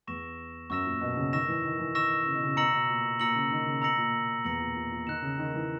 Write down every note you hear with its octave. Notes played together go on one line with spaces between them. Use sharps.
E2 C#6 E6 A#6 E7
F#2 C#6 E6 A#6 E7
A#2
B2
C#3
D#3 C#6 E6 A#6 E7
E3
D#3
E3
D#3 C#6 E6 A#6 E7
C#3
B2
C#3
B2 A#5 E6 A#6 C#7 F#7
B2
A#2
A#2 A#5 E6 A#6 C#7 F#7
C#3
D#3
C#3
B2 A#5 E6 A#6 C#7 F#7
A#2
E2 A#5 E6 A#6 C#7 F#7
A#2
A#2
A#2
D#3 F#6 C#7 E7
C#3
D#3
E3